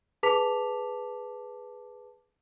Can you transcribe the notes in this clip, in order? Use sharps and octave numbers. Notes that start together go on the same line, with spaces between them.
G#4 B4 A5 D6 B6 F7